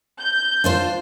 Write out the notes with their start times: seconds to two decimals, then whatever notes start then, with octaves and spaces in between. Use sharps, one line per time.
0.20 G6
0.64 D4 F4 C5